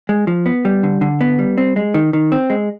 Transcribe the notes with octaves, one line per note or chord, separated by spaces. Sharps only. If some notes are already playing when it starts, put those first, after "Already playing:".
G#3
F3
B3
G3
D3
D3
B3
G3
C4
G#3
D#3
D#3
C4
G#3